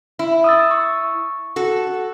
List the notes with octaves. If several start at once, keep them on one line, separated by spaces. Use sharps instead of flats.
E4
D#6 E6 A6
C#6
F#4 A4